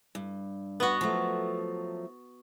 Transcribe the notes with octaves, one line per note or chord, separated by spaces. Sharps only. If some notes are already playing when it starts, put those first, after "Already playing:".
G2
B3 F#4
F3 F#3 A3